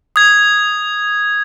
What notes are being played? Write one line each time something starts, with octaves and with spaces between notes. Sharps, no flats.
D#6 G#6